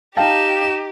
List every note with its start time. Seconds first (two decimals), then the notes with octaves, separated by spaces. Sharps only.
0.17 D#4 G4 F5 G5 A5 E7